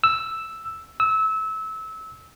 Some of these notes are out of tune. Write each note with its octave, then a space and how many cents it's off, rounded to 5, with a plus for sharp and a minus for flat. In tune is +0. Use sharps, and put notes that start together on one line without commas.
E6 +0
E6 -25